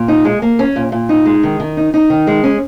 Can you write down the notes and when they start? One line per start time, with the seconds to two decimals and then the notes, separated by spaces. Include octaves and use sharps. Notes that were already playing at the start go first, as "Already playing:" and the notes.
Already playing: A#2
0.08 D#4
0.25 G#3
0.42 A#3
0.59 C#4
0.76 A#2
0.92 A#2
1.09 D#4
1.26 G#3
1.43 D#3
1.60 D#3
1.77 D#4
1.94 D#4
2.10 D#3
2.27 G#3
2.44 C#4